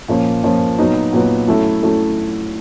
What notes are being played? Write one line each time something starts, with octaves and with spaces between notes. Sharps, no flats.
A#2 F3 A#3 C#4 F4
A#2 F3 A#3 C#4 F4
A#2 F#3 B3 D#4
A#2 F#3 B3 D#4
F#3 A3 C#4 E4 A4
F#3 A3 C#4 E4 A4